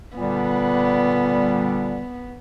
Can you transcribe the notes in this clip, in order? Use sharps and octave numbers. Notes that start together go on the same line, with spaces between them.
A#2 D3 G3 B3